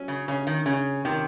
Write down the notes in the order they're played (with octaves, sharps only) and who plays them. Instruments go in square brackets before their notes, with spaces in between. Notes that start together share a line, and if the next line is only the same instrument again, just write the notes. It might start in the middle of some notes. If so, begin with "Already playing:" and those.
Already playing: [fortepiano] F#3 C#4
[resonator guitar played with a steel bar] C#3
[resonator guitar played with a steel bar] C#3 [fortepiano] C#4
[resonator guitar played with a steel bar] D#3
[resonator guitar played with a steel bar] C#3 [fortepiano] C#4
[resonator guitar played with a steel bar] C3 [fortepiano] D#3